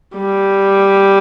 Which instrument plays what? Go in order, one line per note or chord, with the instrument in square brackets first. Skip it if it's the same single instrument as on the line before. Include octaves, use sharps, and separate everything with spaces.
[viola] G3